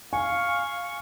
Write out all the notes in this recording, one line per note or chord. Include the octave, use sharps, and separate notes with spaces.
F5 G#5 C#6